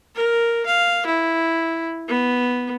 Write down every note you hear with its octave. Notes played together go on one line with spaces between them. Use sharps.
A#4
F5
E4
B3